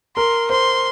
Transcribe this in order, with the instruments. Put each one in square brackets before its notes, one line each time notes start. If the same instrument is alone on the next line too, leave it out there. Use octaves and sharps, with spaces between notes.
[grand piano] A#4 [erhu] C6
[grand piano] C5 [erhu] C6